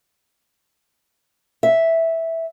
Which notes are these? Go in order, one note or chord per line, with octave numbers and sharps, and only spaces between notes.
E5